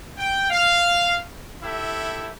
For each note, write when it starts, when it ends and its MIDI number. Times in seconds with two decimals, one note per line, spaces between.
0.18 0.47 79
0.49 1.17 77
1.63 2.29 64
1.63 2.29 67
1.63 2.29 69
1.63 2.29 76